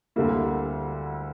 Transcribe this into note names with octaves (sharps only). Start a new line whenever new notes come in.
D2 D3 G3 A#3 E4